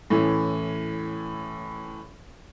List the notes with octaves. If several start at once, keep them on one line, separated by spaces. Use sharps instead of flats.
A2 E3 C#4